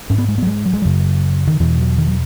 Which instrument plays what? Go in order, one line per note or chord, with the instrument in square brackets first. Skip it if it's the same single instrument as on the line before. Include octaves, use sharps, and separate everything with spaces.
[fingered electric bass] G#2 C#4
B3
G#3
B3
F#3
G#3
F#3
G#3
F#2 C#3 F#3
D#3
E2 B2 E3
F#3
D#3
F#3